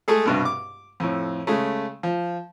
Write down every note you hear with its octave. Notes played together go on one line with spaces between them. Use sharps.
G#3 A3 G#4 A4
C2 G2 B2
D6
F2 A2
C#3 G#3 A3
F3